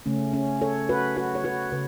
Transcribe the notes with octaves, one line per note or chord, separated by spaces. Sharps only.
C#3 A3 C#4
C#4
A4 C#5
F#4 B4
F#4 B4
C#5
F#4 B4
C#3 B4